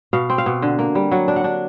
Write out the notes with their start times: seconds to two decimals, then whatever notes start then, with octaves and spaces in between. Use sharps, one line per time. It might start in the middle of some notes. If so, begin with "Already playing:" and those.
0.13 B2 F5
0.30 C4
0.38 F5
0.46 B2
0.62 D3
0.79 A#3
0.95 G3
1.11 F#3 F#5
1.28 D4
1.36 F#5
1.44 D4